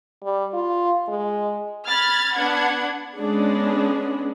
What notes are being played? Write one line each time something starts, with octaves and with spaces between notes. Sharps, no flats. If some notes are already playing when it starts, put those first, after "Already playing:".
G3
F4
G#3
B5 F6 G#6 A6
B3 D4 F#5 G#6
G#3 B3 C#4 D4 G#4